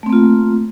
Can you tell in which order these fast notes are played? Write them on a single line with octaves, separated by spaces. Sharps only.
A3 C4 A#3 F4